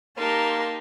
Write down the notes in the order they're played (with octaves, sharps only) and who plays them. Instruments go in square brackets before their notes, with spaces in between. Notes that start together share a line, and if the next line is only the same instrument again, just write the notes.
[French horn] A#3 [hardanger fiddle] D#4 G4 [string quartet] A#4 A5 C6